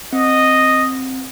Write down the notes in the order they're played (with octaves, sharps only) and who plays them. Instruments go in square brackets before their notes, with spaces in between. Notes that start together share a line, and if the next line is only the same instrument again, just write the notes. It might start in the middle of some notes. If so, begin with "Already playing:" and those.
[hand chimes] C4 [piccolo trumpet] D#5